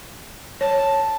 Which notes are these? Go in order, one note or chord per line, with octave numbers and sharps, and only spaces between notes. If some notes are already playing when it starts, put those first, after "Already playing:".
C#5 A5